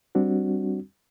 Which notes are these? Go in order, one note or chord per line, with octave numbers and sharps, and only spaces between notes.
G3 C4 D4 F#4